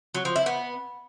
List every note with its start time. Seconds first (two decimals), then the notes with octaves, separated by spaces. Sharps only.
0.14 F#3
0.25 F3
0.36 E4
0.46 B3